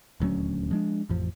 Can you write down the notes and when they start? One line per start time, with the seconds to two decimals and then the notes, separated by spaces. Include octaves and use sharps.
0.20 D#1 D2 F#3 C#4
0.71 F3 G#3 D4
1.09 A1 F2 F3